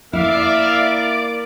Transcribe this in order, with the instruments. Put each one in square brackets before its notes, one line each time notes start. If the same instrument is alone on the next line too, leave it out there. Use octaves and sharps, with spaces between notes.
[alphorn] A#3 [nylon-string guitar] E4 [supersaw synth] D5 D6 [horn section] E5 F5